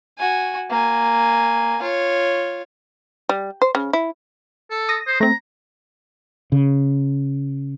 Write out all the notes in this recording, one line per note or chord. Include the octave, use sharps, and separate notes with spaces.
F#4 G#5
A#3 G#5
F4 C#5
G3
C5
C#3
E4
A4
D#6 A#6
C5
A3 C4 A#5
C#3